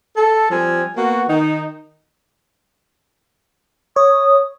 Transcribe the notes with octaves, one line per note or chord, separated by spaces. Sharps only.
A4
F3 G3 C4 G#5
A#3 B3 F#4
D#3 D#4
C#5 D#6